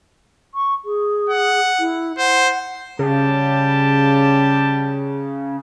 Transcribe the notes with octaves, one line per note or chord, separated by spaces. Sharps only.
C#6
G#4
F#5
E4
C5 F#5
C#3 G3 G4 A5